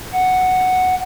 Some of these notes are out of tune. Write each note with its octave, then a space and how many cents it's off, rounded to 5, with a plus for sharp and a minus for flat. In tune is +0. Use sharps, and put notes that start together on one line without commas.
F#5 +0